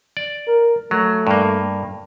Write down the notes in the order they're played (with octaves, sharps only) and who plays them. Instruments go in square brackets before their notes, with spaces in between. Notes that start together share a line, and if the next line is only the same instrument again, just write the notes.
[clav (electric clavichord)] D5
[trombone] A#4
[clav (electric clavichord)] F#3 [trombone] A3
[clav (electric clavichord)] G2 A#3